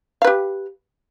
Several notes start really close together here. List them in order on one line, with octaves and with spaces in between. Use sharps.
F5 B4 G4